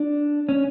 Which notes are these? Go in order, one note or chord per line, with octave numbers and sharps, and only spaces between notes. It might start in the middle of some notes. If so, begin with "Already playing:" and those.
Already playing: D4
C#4